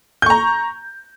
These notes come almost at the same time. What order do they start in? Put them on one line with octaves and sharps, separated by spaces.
G6 C#6 A#5